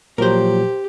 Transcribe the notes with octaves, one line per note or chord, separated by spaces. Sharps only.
A#2 F3 F#3 G4 A#4 C5